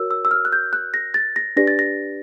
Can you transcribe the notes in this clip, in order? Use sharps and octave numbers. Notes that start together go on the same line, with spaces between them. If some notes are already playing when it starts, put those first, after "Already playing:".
Already playing: F#4 A#4 C#5 E6
E6
E6
F6
F#6
G6
F#6
A#6
A6
A#6
D4 G4 B4 D5 A#6
A6
A#6